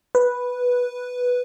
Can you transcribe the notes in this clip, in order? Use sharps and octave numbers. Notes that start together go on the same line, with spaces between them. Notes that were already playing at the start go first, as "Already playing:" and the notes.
B4